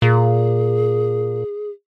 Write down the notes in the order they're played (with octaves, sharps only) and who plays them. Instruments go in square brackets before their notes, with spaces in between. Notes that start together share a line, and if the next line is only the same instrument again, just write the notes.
[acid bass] A#2 [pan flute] G#4